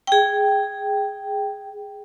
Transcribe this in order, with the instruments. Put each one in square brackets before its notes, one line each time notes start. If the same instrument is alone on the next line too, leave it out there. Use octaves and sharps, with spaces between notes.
[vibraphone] G#4 G5